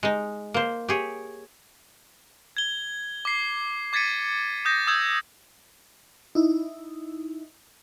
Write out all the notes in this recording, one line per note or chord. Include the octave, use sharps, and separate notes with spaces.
G#3 D#4
A#3 C5
G4 G#4 C#5
G#6 G7
D6 C7
D6 G#6 A6 B6 C#7 D#7
D#6 G6 A#6
D#6 E6 G6 G#6
D#4 E4